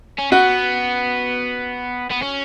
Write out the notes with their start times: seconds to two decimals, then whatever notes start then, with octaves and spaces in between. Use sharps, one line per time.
0.19 C#4
0.32 B3 F#4
2.11 B3
2.22 C#4